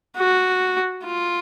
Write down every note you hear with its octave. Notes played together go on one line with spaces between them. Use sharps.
F#4
F4